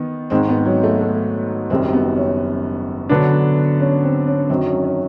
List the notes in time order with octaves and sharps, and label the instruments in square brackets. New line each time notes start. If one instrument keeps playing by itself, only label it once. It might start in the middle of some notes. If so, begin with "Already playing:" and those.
Already playing: [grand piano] D#3 [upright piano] B3
[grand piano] G#2 D#3 G#3 [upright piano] C4
[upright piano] B3
F#3
A3
A3
[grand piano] F#1 F#2 D#3 G3 [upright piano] C4
[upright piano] B3
C#4
[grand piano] D3 F#3 B3 D4
[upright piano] C#4
C4
C#4
[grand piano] F#2 D#3 F#3 [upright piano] C4
[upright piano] C#4
C#4